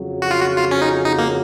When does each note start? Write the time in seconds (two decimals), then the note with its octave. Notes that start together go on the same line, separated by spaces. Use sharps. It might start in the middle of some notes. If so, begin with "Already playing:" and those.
Already playing: F2 C#3 F#3
0.22 F#4
0.31 F4
0.41 F#4
0.57 F4
0.71 C#4
0.82 D#4
1.05 D#4
1.19 A#3